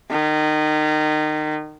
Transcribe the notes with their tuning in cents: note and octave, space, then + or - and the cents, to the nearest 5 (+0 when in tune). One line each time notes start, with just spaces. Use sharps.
D#3 -25